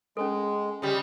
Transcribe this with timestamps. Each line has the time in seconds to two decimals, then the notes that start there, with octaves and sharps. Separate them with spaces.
0.17 G#3 C#4 A4
0.82 C#3 G3